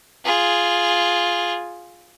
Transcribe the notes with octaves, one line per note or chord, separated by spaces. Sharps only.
F4 G#4